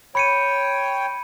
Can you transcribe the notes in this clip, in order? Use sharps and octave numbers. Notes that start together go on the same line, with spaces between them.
C#5 G5 B5 C#7 D#7